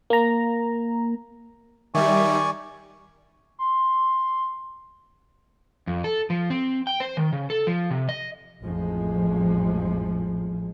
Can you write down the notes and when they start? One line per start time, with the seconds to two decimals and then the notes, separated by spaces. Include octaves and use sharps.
0.10 A#3 A#5
1.94 D#3 G3 D5 E5 G#5 C#6
3.59 C6
5.87 F2
6.04 A4
6.30 F3
6.50 C4
6.87 G5
7.00 C5
7.17 D#3
7.33 C#3
7.50 A4
7.67 F3
7.90 C3
8.09 D#5
8.62 A1 F2 F3 G#3